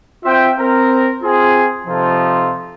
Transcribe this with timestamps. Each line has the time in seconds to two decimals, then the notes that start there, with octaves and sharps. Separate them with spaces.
0.24 C4 F4 E5 G5
0.58 C4 A#4
1.23 C4 F4 G#4
1.87 C3 F3 D#4 F4 A4